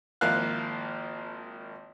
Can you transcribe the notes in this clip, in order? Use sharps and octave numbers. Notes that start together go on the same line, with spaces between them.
G#1 F3 A#3 E4 F5 F#6